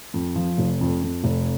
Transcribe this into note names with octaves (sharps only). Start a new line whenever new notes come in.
F2
F3
F1
F2
F2
F1